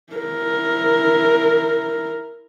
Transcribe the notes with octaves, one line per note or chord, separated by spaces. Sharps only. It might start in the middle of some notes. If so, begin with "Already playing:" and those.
E4 A#4